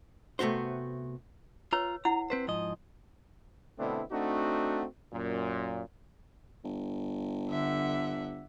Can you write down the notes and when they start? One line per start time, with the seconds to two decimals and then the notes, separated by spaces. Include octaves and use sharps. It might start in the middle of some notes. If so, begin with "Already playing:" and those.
0.39 C3 A3 B3 F#4 C5
1.73 F4 B4 C#5 A#5
2.05 E4 F#5 A#5
2.30 C4 B4 C5
2.48 G#2 F3 D#5
3.78 B2 D3 A3 C4 D4 E4
4.11 A3 C4 D4 D#4 F#4
5.12 F#2 A#2
6.64 G1
7.49 D3 E5 F#5